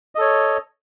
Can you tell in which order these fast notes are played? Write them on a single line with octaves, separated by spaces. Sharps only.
D#5 A4 C#5